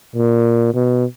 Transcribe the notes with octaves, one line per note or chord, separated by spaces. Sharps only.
A#2
B2